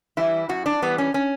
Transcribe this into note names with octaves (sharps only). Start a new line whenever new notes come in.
E3 G3 E4
F#2 F#4
D4
E3 G3 B3
C#4
C#4